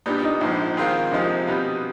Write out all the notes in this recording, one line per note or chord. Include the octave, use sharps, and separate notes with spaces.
A#2 G3 B3 D4 D#4
D#4
A#1 G#2 F3 D#4
D#3 G#3 C4 F4 A#4
C2 C3 F3 G#3 D#4
B2 G3 B3 D#4